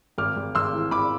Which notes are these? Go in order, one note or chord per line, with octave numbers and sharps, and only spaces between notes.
G#1 D6 F6
G#1
G#1 C6 E6
E3
G#1 B5 D6